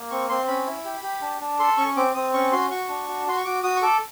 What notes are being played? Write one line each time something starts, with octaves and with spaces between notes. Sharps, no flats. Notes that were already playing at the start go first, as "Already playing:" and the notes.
Already playing: A#3
C4 C#6
C4 C6
C#4 B5
E4
G4
G4
D4
D4
A4 C6
C#4 C#6
C4 D6
C4 D#6
C#4 C#6
F#4 C6
F#4 C#6
D4
F#4
F#4 C6
C#6
F#4 D6
F#4 D#6
C#6
A4 D6